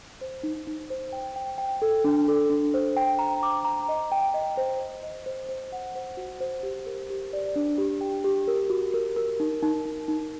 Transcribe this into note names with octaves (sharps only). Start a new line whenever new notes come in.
C5
D#4
D#4
C5
G5
G5
G5
A4
D4
A4
D4
C5
G5
A#5
D6
A#5
D#5
G5
D#5
C5
D#5
D#5
C5
C5
F#5
C5
F#4
C5
G4
A#4
G4
D5
D4
G4
G5
G4
A#4
F#4
A#4
A#4
D#4
D#4
D#4
D#4